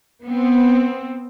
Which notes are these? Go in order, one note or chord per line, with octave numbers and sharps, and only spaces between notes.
B3 C4